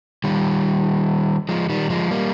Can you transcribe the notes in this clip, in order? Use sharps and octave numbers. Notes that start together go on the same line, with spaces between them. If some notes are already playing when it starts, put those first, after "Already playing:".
D#3 G3
F3 G#3
D#3 G3
F3 G#3
G3 A#3